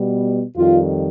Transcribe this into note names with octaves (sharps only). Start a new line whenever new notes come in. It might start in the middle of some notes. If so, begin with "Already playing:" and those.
Already playing: B2 G3 B3
F2 D#3 G3 F4